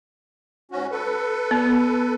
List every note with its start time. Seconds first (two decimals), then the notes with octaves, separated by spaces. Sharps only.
0.72 G#2 C#4 F#4
0.91 A4 B4
1.51 B3